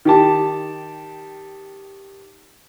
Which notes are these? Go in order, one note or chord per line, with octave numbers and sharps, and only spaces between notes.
D#3 G4 A5